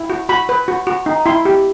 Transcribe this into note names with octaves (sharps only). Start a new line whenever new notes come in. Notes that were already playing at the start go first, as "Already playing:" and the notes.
Already playing: E4
F#4
F#4 B5
B4
F#4
F#4
D#4
E4 C6
G4